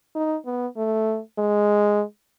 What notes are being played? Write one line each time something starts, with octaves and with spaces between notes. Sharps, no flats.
D#4
B3
A3
G#3